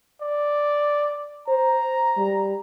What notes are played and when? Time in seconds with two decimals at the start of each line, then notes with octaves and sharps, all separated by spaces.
0.22 D5
1.48 C5 A#5
2.17 G3